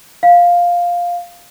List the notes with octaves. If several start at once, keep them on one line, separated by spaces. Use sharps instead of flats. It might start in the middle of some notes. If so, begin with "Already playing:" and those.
F5